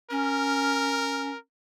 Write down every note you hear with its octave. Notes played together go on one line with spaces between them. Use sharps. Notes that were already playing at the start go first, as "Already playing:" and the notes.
C#4 A#4